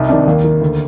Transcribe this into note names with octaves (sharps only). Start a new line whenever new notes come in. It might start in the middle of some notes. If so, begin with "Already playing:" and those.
Already playing: C2 D#4
C3 D#3 D4
D#2 A#3
D#3
D2